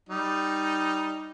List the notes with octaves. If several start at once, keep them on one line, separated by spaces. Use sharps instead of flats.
G3 D#4